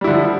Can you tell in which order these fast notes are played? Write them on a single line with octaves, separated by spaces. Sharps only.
G3 E4 D3 F3